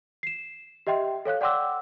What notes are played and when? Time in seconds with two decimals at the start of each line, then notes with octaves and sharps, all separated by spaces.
0.23 C7 E7
0.87 G4 D#5 E5 G5 C6
1.25 A4 C#5 F5 F#6
1.41 D5 F#5 G5 C6 D6 E6